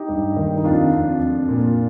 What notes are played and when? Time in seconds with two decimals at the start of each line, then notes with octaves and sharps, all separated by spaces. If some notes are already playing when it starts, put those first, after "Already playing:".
Already playing: D#4 G4
0.09 G2
0.36 D#3
0.57 D#4
0.64 F2 D4 F4
0.92 F2
1.20 F2
1.49 A#2